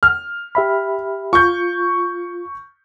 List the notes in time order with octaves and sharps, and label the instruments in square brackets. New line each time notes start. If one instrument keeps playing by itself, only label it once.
[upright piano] F6
[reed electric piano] G4 E5 B5
[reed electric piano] F4 [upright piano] C#6 G6